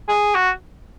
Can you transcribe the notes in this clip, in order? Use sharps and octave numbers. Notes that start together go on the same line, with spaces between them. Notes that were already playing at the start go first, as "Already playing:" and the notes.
G#4
F#4